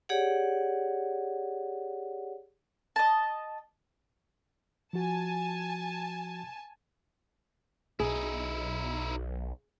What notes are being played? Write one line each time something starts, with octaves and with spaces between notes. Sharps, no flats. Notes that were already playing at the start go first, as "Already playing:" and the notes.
G4 G#4 C#5 D5 F#5
D#5 A5
F3 F#4 G#5 A5
B1 D#4 E4 G#4